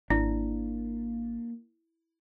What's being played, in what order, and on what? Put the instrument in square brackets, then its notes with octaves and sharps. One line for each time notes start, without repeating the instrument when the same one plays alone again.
[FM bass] G#1 [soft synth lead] A#3 [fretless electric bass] D4 [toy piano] E4